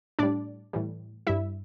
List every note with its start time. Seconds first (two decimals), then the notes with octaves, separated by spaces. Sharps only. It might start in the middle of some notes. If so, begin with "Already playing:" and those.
0.19 A2 G3 D4 D5
0.73 A2 E3 G3
1.27 G2 G3 E4 E5